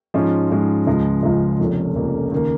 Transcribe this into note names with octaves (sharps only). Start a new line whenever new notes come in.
G#2 F3 G#3 C#4
G#2 F3 G#3 C#4
C#2 C#3 F3 G#3
C#2 C#3 F3 G#3
F1 F2 C#3 A#3 C#4
F1 F2 C#3 A#3 C#4
D#2 C#3 A#3